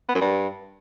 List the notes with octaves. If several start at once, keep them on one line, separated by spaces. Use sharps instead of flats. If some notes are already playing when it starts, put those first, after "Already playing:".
B3
F#2
G2